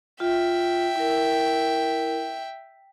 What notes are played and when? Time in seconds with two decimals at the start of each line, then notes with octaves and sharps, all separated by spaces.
0.20 F4 E5 G5
0.96 E4 A#4